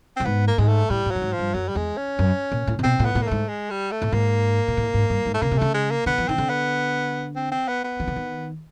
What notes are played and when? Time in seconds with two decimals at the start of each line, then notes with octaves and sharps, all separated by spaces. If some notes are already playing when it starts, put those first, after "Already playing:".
0.17 C4
0.20 A2
0.25 G#2 B3
0.48 A#3
0.58 G#2 G#3
0.68 A3
0.90 A2 G3
1.06 A2
1.11 G2 F#3
1.22 G#2
1.33 F3
1.39 G2
1.54 F#2 F#3
1.69 G3
1.75 E2 G#3
1.97 C#4
2.19 F#2
2.52 A#2
2.67 A2
2.79 C3
2.83 B2 C4
2.99 A2
3.05 B3
3.15 A2
3.23 A#3
3.26 A3
3.31 G#2
3.48 G#3
3.70 G3
3.91 A3
4.02 A2
4.12 G#2 A#3
4.68 A#2
4.77 A2
4.94 G#2
5.10 G2
5.25 G#2
5.34 A3
5.42 C#3 A#3
5.51 C3
5.58 C#3 A3
5.74 G#3
5.91 A#3
6.06 D3 B3
6.18 E3
6.28 D#3 C4
6.38 D3
6.50 B3
7.35 C4
7.51 C4
7.68 B3
7.84 B3
8.00 D#3
8.08 D3
8.16 D#3